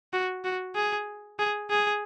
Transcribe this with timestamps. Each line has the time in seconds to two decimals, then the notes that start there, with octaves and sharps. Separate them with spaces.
0.13 F#4
0.44 F#4
0.75 G#4
1.39 G#4
1.70 G#4